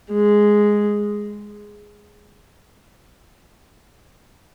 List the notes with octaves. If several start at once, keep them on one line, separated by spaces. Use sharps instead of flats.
G#3